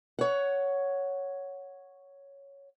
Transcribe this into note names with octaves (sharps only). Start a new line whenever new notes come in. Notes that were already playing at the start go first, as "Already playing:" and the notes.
C#5 F#5